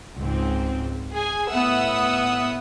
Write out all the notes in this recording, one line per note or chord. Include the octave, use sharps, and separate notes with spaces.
C#2 G#2 C4
G#4 G#5
A2 B3 E5 F#5 D#6 E6